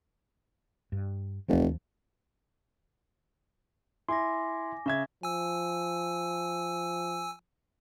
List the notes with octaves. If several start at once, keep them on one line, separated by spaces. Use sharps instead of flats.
G2
F1 D#2 E3 F3
E4 G#5 C6 D6 A#6
C#3 E5 C#6 G#6
F3 G#5 E6